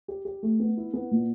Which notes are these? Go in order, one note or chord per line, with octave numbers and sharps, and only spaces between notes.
G4
G4
A3
B3
E4
B3
A#2